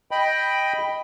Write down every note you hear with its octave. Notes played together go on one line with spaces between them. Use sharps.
D#5 G5 B5